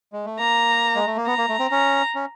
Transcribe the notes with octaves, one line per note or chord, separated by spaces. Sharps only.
G#3
A3
A#3 A#5
G#3
A3
A#3
B3 A#5
A#3
A3
C4
C#4 A#5
C#4